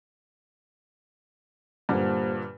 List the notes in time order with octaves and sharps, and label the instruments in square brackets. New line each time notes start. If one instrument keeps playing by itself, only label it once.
[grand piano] G2 A#2 D3 [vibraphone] A#3 G4 C5